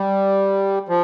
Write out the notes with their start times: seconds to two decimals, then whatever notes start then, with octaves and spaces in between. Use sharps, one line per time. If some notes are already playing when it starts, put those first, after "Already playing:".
Already playing: G3
0.89 F3